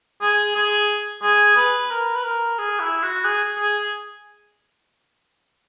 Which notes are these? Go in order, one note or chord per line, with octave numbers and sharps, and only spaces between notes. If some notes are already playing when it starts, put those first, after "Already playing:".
G#4
G#4
G#4
B4
A#4
B4
A#4
G#4
E4
F#4
G#4
G#4